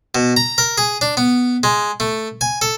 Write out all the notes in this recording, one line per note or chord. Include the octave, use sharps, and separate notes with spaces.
B2
A#5
A#4
G#4
D4
B3
G#3
A3
G#5
A4